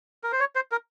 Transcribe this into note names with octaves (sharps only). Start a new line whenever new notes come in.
A#4
C5
C#5
C5
A#4